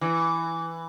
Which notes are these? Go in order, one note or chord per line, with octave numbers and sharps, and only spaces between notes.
E3